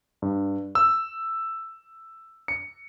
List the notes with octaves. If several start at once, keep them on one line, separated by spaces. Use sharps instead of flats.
G2
E6
C#7